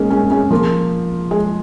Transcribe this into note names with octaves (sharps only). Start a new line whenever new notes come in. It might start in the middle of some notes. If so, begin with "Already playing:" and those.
Already playing: G#3 A#3 C#4 D#4
G#3 C#4
G#3 C#4
F3 A#3
G#3